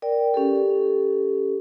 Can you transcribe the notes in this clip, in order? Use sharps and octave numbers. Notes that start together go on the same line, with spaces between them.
A#4 D5 G5
C#4 G4 A4